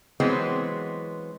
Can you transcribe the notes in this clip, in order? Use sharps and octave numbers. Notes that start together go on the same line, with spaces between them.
E3 F#3 G#3 B3 C4